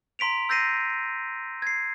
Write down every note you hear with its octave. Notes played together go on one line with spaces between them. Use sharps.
A#5 C6 B6 D7 F7
E6 G6 A6 A#6 C7 D#7
G#6 C7